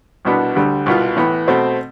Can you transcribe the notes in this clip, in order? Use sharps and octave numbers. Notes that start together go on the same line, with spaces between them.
C2 B2 B3 D4
D2 D3 G3
C2 B2 B3 F4
A2 E3 B3
B2 A3 C4